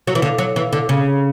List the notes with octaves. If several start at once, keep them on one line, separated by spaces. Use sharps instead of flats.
F#3
E3
D3
F#3
E3
D3
C#3